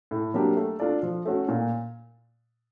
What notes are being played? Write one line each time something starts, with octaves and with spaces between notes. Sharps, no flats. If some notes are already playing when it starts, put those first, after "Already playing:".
A2
F#3 A#3 D4 G4
A3
D4 F4 A4 D5
F3
A3 C#4 F#4
A#2